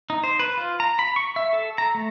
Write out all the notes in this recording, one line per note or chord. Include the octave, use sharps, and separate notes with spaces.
D#4
C5
B4
F4
A#5
B5
C#6
E5
A4
A#5
A3